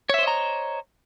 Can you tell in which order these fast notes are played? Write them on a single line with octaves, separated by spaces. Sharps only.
C#5 E5 C5 D#5 A#5